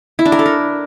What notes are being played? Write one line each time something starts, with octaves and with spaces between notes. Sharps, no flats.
E4
D4
A#4
A4
A#4